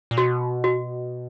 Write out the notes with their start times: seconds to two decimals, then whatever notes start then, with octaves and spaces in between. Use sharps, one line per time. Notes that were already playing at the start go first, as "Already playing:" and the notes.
0.11 A#2
0.17 B2 F#4
0.64 F#4